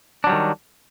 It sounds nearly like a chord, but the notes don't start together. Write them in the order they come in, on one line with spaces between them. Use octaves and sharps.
D4 F#3 G3 D#3